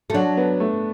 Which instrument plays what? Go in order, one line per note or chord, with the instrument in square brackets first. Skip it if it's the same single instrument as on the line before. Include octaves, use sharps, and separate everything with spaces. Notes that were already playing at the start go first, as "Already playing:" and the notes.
[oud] A3
[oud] F#3 [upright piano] D4
[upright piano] B3
A3